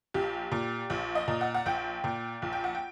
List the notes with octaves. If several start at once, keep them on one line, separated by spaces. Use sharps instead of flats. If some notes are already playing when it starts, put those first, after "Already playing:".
A#1 G4
A#2
A#1
D#5
A#2
F#5
F#5
A#1 G5
A#2
A#1
G5
F#5
G5